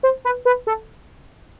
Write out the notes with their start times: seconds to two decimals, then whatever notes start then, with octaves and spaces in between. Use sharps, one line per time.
0.03 C5
0.25 B4
0.45 B4
0.67 A4